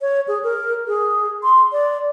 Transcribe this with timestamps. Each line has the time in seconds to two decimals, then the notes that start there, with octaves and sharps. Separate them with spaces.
0.01 C#5
0.28 G#4
0.44 A#4
0.87 G#4
1.43 C6
1.72 D5